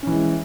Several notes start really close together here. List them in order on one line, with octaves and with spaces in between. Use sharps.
C#4 E3 G#3